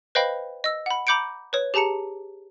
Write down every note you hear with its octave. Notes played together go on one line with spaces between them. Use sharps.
B4 C5 D#5 F5 G5 B5
D#5 E6
F#5 B5
A#5 B5 D6 G6 C#7 D7
B4 C#5
G4 G#4 A5 A#5 C#7